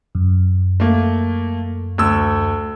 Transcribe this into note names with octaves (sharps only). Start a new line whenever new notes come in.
F#2
A3 A#3
D2 E6